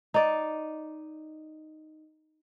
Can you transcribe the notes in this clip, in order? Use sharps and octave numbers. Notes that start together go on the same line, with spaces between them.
D#4 D5